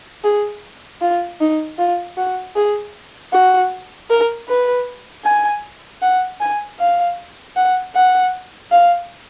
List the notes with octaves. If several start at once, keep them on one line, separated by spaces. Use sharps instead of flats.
G#4
F4
D#4
F4
F#4
G#4
F#4
A#4
B4
G#5
F#5
G#5
F5
F#5
F#5
F5